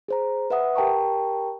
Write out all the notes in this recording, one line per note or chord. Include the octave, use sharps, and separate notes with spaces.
G#4 C5 A#5
B4 E5 F#5 D#6
G4 A#4 G5 A5 A#5 C#6